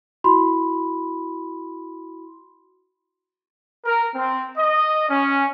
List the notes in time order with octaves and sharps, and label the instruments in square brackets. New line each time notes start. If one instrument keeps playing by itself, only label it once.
[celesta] E4 F#4 B5 C6
[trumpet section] A#4
C4
D#5
C#4